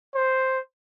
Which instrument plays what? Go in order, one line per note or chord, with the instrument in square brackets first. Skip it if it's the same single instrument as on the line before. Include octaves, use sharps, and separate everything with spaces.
[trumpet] C5